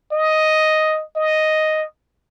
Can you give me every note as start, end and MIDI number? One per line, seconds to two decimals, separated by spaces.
0.12 1.03 75
1.16 1.84 75